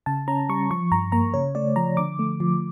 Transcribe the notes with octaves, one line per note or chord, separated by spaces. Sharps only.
C#3 A5
C#4 A#5
G3 C#6
F3 C#6
G2 A#5
A#3 A#5
C#3 C#5
A3 D5
F3 A#5
D3 D6
A3
F3